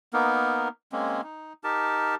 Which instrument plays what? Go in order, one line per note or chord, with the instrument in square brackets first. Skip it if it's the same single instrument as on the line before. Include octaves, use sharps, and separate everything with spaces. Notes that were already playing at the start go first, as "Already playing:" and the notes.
[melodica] A#3 B3 D#4 A#4
G#3 A#3 C4 C#4
D#4
D#4 G4 A#4 A5